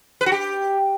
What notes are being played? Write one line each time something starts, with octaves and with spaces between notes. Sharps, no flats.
B4
F#4
G4